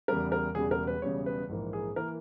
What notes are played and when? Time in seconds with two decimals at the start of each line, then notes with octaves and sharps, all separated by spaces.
0.08 E2 C#3 G3 A#4
0.32 A#4
0.55 E1 E2 C#3 G3 G#4
0.71 A#4
0.87 B4
1.02 E1 E2 C#3 G3 C#5
1.26 B4
1.49 A#1 G#2 E3 A#3
1.73 G#4
1.96 E3 A#3 A#4